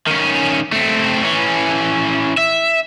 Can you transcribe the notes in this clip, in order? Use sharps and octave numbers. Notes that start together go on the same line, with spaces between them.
D#3 C#4
A3 C4
E3 C#4
E5